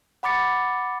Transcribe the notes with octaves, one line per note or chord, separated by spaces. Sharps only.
F#5 B5 D6 A6 C#7